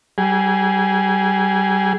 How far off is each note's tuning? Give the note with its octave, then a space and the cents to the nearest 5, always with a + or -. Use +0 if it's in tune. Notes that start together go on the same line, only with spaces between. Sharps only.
G3 -30 G#4 +0